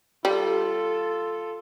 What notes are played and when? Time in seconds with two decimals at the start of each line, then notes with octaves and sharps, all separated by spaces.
0.25 G3 F4 A4